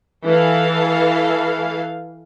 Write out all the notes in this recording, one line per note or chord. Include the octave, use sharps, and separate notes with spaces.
E3 A4 F5